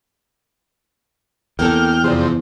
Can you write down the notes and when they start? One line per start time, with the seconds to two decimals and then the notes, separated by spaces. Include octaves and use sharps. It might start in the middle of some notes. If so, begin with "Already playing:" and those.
1.59 E2 A#3 C4 A4 G5 F6
2.04 F2 C3 G#4 C5 D5